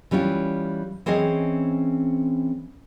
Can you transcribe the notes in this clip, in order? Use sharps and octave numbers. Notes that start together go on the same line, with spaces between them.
E3 G3 C#4 E4 F4
E3 C4 C#4 G#4 D#5